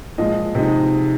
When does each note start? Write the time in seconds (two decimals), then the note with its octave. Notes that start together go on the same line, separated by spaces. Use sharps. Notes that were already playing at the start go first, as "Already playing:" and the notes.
0.18 A#2 F3 G#3 D#5
0.55 C3 F3 G#3 D#4